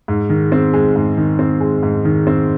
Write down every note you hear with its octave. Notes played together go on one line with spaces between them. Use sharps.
G#2
D#3
C4
G#3
G#2
D#3
C4
G#3
G#2
D#3
C4